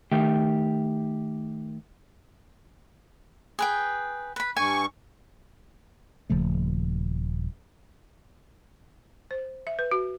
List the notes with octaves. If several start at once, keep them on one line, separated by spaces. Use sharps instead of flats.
D#3 A3 D#4 G4 G5
G#4 B4 G5
B4 B5
G2 G#5 C#6
D#1 C#3 F3 A3
C5
E5
B4
F#4